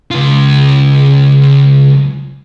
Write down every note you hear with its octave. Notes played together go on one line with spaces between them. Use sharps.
C#2 F4